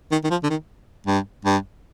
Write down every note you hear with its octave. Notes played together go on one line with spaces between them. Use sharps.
D#3
D#3
F3
D3
D#3
G2
G2